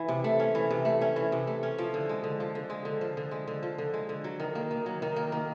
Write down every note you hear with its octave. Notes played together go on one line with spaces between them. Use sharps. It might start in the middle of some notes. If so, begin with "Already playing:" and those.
Already playing: E3
C3
A3
C#4
E3
C3
A3
C#4
E3
C3
A3
C#4
F3
D3
G#3
D3
F3
D3
G#3
D3
F3
D3
G#3
D3
F3
D3
G#3
D3
F#3
D#3
A#3
D#3
F#3
D#3
A#3
D#3